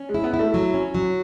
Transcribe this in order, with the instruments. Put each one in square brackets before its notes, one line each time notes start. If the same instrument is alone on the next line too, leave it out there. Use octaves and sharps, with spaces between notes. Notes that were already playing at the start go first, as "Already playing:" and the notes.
Already playing: [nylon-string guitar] C#4
[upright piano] G#3
[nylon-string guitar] E4
[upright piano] B3
[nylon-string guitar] E4
[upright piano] A3
[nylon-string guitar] F#3
C#4
F#3